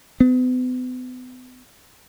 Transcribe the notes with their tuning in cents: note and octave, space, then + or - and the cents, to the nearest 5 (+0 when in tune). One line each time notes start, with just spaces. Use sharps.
B3 +40